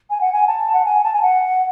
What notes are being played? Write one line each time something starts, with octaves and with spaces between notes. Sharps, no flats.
G#5
F#5
G#5
A5
F#5
G#5
A5
G#5
F#5